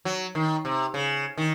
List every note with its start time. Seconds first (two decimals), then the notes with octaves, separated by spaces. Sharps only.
0.05 F#3
0.35 D#3
0.65 C3
0.94 C#3
1.38 D#3